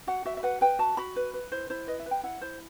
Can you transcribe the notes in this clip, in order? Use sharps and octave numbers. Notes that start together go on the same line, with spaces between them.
F#4 F#5
F#4 E5
E5
B4 F#5
B4 G5
F#4 A5
F#4 B5
B4
B4
E4 C5
E4 C5
B4 D#5
E5
B4
G5
E4 F#5
E4 C5